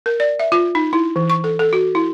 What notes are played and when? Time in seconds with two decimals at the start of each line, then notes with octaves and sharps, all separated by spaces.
0.06 A#4
0.20 D5
0.40 E5
0.52 F4
0.75 D#4
0.93 E4
1.16 E3
1.30 C#6
1.44 A4
1.59 A4
1.73 F#4
1.95 E4